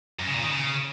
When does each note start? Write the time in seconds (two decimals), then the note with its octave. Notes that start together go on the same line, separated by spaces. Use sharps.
0.19 F#2
0.27 C#3
0.35 A#2
0.43 D#3
0.51 C#3